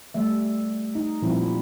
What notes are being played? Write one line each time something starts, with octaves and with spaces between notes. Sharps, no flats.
G3 A3 E5
D#4
A#2 F3 G3 C4 E4